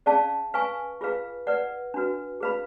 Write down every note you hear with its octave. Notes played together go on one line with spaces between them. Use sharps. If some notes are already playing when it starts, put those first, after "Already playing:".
C#4 G#4 D5 F5 A5
B4 F5 G#5 C#6
F4 G#4 B4 F5
B4 D5 F#5
D4 F#4 B4
G#4 B4 F5 B5